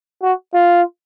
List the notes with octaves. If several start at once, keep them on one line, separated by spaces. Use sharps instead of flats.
F#4
F4